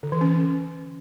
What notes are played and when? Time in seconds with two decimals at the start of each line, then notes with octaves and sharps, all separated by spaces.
0.03 D3
0.12 E3
0.21 C#4